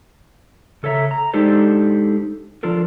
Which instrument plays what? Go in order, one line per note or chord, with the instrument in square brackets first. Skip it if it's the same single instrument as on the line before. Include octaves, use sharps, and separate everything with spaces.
[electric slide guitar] C#3 A4 C#5 E5 A#5
A#5
G#3 D4 D#4 G4 A4 C5
F3 D4 F4 A4 A#4